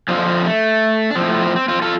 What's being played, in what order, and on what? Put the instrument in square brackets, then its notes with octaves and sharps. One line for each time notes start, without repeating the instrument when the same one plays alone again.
[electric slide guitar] F2 D3 F3 C4 F4
C4
A3
D4
A2 F3 C4
A3
C4
C4
C4 F4
F4 A4